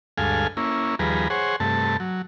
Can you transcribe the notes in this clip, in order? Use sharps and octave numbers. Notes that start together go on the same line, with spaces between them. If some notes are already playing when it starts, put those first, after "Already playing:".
D2 G2 G#3 A4 F5 G#5
A#3 C#4 E4
D#2 F3 G3 G#4 B4 A#5
G#4 C5 C#5 F#5
G2 C3 A3 A5
F#3